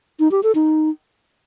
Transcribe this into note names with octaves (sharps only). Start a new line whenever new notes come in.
D#4
G4
A4
D#4